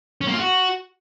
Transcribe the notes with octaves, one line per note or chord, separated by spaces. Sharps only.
C#4
A#3
F4
F#4